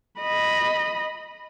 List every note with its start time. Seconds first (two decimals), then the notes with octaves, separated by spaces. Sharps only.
0.20 D#5 B5